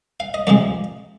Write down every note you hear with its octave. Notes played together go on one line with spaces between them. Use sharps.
F5
D#5
F2 C3 F3 G#3 D5